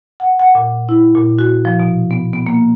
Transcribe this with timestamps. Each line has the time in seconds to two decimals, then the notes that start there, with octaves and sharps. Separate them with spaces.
0.20 F#5
0.39 F#5
0.55 A#2
0.89 E4
1.15 A#2
1.39 F#4
1.65 F3
1.80 B2
2.11 B3
2.33 B3
2.47 A#3